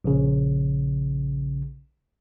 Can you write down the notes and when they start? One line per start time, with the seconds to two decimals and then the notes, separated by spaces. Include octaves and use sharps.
0.04 A#1 C#3